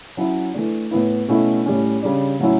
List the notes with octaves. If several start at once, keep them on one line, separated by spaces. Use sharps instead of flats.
F#3 C#4 E4
E3 A3 D4
A2 E3 B3 E4
B2 A3 C#4 E4
A2 G3 C#4
C#3 G3 D4
A2 F#3 C#4 E4